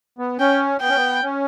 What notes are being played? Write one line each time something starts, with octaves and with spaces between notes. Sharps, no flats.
B3
C#4 G5
B3 G5
C#4
B3
C#4